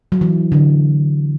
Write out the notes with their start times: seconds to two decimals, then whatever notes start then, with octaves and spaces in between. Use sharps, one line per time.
0.12 F#3
0.21 E3
0.52 D3